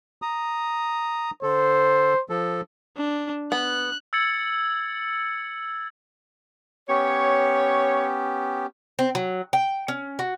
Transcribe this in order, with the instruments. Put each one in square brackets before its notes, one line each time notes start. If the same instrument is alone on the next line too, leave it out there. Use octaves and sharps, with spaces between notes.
[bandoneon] A#5 D#6
[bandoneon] D3 A4 [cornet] C5
[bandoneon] F3 A4
[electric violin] D4
[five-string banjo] B3 [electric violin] F#6
[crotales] E6 G#6 A6 C#7 F#7
[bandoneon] B3 C#4 G4 [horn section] C#5
[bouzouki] C4
F#3
G5
C#4
F#4